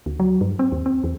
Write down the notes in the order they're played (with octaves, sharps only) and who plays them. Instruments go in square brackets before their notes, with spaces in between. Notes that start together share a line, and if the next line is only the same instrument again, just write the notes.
[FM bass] D2
F#3
G2
C4
D#2
C4
E2